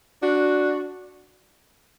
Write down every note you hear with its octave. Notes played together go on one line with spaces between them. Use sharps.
D4 F#4